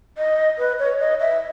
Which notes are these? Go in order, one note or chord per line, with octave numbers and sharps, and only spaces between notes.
D#5
B4
C#5
D#5
E5